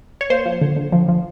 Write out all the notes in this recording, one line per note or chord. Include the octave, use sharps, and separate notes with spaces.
C#5
A#3 C5
F3
D3
D3
F3
F3